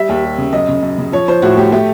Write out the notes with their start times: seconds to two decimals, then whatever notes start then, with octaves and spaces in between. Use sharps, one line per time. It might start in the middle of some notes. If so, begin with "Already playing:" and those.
Already playing: G3 E5
0.09 D#2
0.24 G3
0.38 C#3
0.53 F#2 D#5
0.68 C#3
0.82 F#2
0.98 C#3
1.12 F3 C#5
1.28 F3 C5
1.42 A2 F#4
1.57 A3 G4
1.72 A3 G4